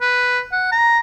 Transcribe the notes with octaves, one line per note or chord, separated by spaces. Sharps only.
B4
F#5
A#5